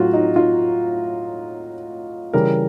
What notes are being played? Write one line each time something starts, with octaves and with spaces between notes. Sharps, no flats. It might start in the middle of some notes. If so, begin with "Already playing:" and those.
Already playing: A2 F#3 F4 F#4
D#4
F4
C#3 E3 G3 A#4